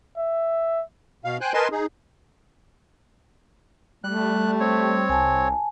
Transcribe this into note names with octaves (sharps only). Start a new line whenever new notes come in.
E5
B2 F5
C5 G5 G#5 F#6
A#4 B4 D#5 G#5 A5 C6
D#4 G#4
G3 A3 F#6
C4 C#5
C2 G#5 A5